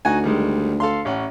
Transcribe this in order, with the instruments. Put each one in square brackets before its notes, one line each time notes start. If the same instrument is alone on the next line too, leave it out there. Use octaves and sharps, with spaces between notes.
[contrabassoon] D2 [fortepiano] D#4 F#4 G#5
[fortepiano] D#3 G3 G#3
A4 F5 C6
A1 C#4 F#5